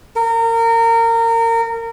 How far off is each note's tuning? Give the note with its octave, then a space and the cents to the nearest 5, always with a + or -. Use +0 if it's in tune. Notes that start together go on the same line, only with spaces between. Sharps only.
A#4 -25